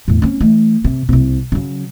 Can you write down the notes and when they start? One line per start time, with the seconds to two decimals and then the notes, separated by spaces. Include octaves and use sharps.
0.08 E2 A2
0.22 C4 C#4
0.41 E3 A3
0.84 C3
1.09 C2 C3
1.52 C#3 F#3